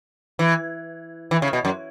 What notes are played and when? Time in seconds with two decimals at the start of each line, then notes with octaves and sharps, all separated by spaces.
0.39 E3
1.31 E3
1.42 C#3
1.53 B2
1.65 F#2